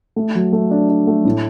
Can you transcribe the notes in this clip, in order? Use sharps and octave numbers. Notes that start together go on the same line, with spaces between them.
A3
F#3
A3
D4
D4
A3
A2